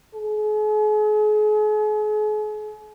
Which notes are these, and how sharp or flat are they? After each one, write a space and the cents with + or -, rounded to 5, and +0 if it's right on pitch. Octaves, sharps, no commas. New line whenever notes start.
G#4 +40